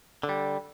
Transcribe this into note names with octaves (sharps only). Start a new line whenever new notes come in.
D3
G3